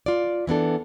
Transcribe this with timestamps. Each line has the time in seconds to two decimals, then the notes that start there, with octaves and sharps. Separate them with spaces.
0.06 F4 D5
0.47 E3 B3 D4 A4